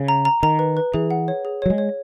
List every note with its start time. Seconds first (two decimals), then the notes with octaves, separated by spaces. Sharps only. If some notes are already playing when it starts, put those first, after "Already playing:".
Already playing: C#3
0.08 A#5
0.25 A#5
0.43 D#3 A#5
0.59 B4
0.77 B4
0.94 E3 G#4
1.11 F#5
1.28 C#5
1.45 G#4
1.62 F#3 C#5
1.70 G#3
1.78 C#5